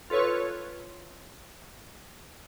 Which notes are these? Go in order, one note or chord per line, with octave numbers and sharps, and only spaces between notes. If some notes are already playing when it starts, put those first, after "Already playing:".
F4 A4 B4 C#5 C#6